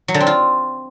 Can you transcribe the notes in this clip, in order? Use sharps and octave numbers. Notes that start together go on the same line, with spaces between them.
F#3
D3
C4
F4